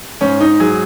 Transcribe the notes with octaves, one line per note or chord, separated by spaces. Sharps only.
G#2 C#4
D#4
F#3 G#4